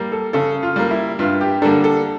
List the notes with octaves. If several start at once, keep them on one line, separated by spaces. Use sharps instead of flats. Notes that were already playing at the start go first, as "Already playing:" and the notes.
Already playing: G3 A#3
A4
C#3 A4
F4
G3 A#3
E4
G2 F4
G4
D3 G3 A#3 D4 A4
A4